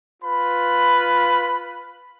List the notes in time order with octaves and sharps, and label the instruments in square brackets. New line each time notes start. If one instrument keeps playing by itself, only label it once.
[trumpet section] F4 B4 B5